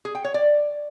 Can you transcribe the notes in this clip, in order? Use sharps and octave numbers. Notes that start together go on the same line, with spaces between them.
G#4
G5
C#5
D5